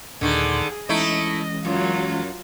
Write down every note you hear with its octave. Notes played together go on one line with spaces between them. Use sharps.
D#2 A#2 D3 D#3 G#4
E3 G#3 A3 C#4 D#4 E4 D#5
F#2 F#3 F4